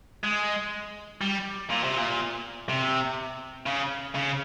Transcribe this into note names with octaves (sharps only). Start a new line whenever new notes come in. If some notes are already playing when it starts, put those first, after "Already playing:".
G#3
G3
A#2
C3
A#2
C3
C#3
C#3